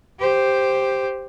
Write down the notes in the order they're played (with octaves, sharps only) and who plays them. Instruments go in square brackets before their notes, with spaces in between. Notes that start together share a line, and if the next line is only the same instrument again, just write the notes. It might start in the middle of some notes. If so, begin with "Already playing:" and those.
[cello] G4 C5